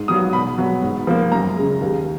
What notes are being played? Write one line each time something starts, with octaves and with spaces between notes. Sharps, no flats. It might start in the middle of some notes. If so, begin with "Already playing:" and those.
Already playing: G#2
F#3 B3 D#6
B2 B5
F#3 B3
G#2
F3 A#3
F#2 A#5
C#3 G#3
D#2